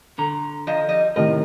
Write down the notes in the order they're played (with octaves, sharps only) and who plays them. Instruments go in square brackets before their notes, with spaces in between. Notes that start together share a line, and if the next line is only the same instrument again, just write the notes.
[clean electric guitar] D3 A#5
[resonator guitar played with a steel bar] F3 D#5
G3 D#5
[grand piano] A2 C3 D#3 [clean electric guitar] A#4 [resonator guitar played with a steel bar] D#5